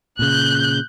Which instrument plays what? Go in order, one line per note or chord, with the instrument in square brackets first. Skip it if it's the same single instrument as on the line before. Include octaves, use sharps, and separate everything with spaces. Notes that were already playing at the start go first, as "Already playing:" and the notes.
[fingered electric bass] A#2 C#3 [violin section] F#6 G6